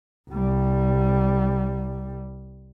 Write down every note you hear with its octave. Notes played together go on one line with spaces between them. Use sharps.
C2 G3